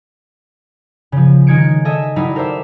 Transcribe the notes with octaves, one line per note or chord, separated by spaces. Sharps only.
C#3 F3
D#3 G#3 D#4 G#6 C#7 D7
A4 D#5 E5 G#5
F#3 G3 D#4 E4
A4 A#4 C5 D5 E5